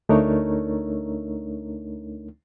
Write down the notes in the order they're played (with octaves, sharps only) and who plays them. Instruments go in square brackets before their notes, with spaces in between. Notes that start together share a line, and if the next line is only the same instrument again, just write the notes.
[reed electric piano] D2 A3 D4 D#4 A#4 C#5